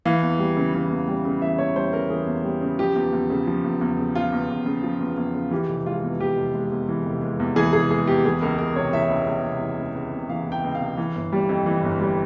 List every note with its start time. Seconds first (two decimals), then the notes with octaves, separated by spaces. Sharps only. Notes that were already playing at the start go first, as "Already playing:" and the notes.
0.05 E3 F5
0.22 E2
0.39 G3
0.57 C#3
0.74 E3
0.90 E2
1.08 G3
1.25 C#3
1.42 E3 E5
1.58 E2 C#5
1.76 G3 C5
1.93 C#3 A#4
2.10 E3 G#4
2.27 E2
2.44 G3
2.61 C#3
2.79 F3 G4
2.95 E2
3.12 E2
3.30 C#3
3.47 F3
3.64 E2
3.81 E2
3.98 C#3
4.15 F3 F4
4.32 E2
4.50 E2
4.66 C#3
4.84 F3
5.00 E2
5.17 E2
5.35 C#3
5.51 E3 G4
5.69 F1
5.86 G#3 F4
6.03 E2
6.20 E3 G4
6.37 F1
6.54 G#3
6.72 E2
6.89 E3
7.06 F1
7.22 G#3
7.40 E2
7.56 E3 G#4
7.73 F1 G#4
7.90 G#3 G#4
8.07 E2 G4
8.25 E3 G#4
8.41 C#2 A#4
8.58 C#2 A#4
8.76 C3 C#5
8.93 E3 E5
9.10 C#2
9.27 C#2
9.44 C3
9.61 E3
9.78 C#2
9.95 C#2
10.13 C3
10.30 E3 F5
10.46 C#2
10.52 G5
10.64 C#2
10.75 F5
10.81 C3
10.97 E3
11.15 G1
11.32 G3
11.49 F2
11.66 E3
11.83 G1
12.00 G3